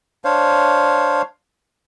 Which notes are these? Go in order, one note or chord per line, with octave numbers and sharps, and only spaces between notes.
D4 C5 C#5 F5